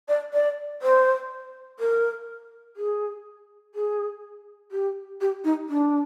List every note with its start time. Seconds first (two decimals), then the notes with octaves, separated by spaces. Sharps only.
0.08 D5
0.33 D5
0.82 C5
1.79 A#4
2.77 G#4
3.75 G#4
4.72 G4
5.21 G4
5.44 D#4
5.69 D4